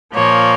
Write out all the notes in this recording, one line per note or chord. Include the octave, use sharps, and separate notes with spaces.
A#2 F3 A#3 C#5